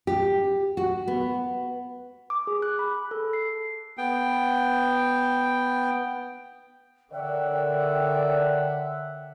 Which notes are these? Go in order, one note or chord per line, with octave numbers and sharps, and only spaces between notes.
G4
F#4
B3
D6
G#4
F#6
B5
A4
C7
B3 G5
D3 A#4 C#5 D5 E5 F#5 G5